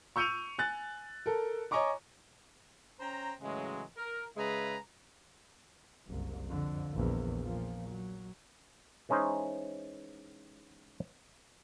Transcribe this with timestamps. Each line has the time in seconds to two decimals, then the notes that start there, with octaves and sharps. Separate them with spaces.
0.16 C#6 E6 G6 C#7 D#7 F7
0.59 G#5 F#6 A6
1.26 A4 A#4
1.71 C#5 D#5 G#5 A#5 C#6 D6
3.00 C#4 C5 G5 A#5
3.41 A2 C#3 E3 F#3 G#3
3.97 A#4
4.37 C#3 G#3 G#4 B4 E5 A#5
6.08 F#1 C2
6.47 F2 D3
6.94 A#1 E2
7.42 A#2 F3
7.89 F#3
9.09 E3 G#3 C#4 D#4 C5